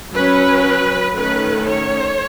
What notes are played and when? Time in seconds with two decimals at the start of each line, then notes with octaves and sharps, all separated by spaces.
0.13 F#3 C#4 B4
1.15 D#3 A3 C#4 B4
1.66 C#5